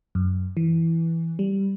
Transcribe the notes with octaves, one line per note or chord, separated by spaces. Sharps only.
F#2
E3
G3